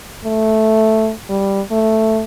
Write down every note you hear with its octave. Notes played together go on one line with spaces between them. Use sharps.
A3
G3
A3